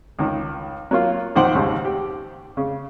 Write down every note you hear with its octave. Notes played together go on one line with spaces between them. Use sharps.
C#2 D#3
F#3 A#3 F4
A#1 D#3 C4 C5 F#5 D6
D#2 G#2 C#3
G4
C#3